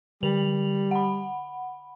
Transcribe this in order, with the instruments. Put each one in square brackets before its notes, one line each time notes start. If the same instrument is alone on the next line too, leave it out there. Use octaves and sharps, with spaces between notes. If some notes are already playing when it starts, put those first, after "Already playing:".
[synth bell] D3 F7 F#7 [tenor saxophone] G3
[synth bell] F#5 B5